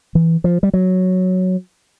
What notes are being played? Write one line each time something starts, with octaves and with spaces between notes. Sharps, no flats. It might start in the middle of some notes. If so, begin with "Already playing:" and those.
E3
F3
G3
F#3